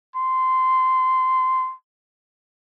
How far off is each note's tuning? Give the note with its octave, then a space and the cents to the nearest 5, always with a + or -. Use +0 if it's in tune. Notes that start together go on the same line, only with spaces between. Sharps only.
C6 -15